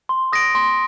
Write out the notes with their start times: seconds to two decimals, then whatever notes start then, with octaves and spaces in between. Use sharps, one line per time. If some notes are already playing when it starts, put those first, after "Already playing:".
0.09 C6
0.33 D#6 A#6 D7
0.55 C6